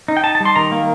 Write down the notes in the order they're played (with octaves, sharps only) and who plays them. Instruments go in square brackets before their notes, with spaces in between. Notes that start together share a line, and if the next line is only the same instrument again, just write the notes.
[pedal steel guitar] D#4
G5
D#4 A5
A5
G3
C6
D#3 A#5
A#3